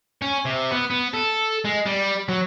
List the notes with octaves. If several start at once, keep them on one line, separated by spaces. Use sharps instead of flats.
C#4
C3
B3
B3
A4
G#3
G3
F#3